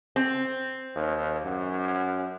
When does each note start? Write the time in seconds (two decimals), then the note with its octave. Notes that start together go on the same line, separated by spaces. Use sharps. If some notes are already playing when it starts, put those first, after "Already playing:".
0.16 C4
0.95 D#2
1.44 F#2